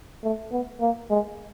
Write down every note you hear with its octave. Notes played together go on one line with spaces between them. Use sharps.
A3
B3
A#3
G#3